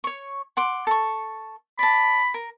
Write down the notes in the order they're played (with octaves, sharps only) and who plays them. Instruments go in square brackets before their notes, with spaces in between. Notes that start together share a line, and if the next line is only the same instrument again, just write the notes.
[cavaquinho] C#5 C#6
F#5 C6 D6
A4 C#6
[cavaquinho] D5 A5 [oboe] B5
[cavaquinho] A#4